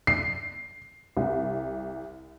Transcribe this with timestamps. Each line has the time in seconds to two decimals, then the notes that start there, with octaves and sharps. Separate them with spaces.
0.07 C7
1.17 C2